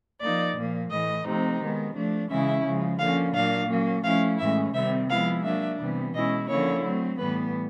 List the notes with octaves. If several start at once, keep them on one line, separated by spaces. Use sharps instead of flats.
F3 A#3 D#4 D5
A#2 F3 A#3
A2 E3 A3 D#5
C3 F3 A3 C4 D#4
D#3 G#3 B3
F3 A3 D4
C#3 E3 G#3 C#4 E4 E5
C#3 F3 G#3
D3 F3 A#3 C#4 F5
A#2 F#3 A#3 D4 F5
F#3 A#3 C#4
F3 A3 C#4 E4 F5
A2 E3 G#3 C#4 E5
C3 D#3 G3 C4 E5
F3 G#3 B3 E4 F5
F#3 A#3 D4 E5
C3 E3 G3 B3
B2 G#3 C#4 E4 D#5
D3 F3 A#3 C#4 E4 C#5
F#3 A3 C4
A2 E3 G3 B3 B4